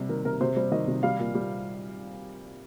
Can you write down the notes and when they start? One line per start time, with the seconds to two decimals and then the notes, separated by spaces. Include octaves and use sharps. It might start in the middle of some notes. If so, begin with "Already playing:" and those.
Already playing: C3 G3
0.09 D#3 A#4
0.25 C3 A#4
0.41 C3 C5
0.56 G3 C5
0.71 D#3 D#5
0.88 C3
1.03 G3 F5
1.19 A#2
1.35 G3